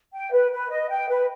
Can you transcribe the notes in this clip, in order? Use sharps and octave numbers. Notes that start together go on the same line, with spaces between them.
G5
B4
B4
D#5
G5
B4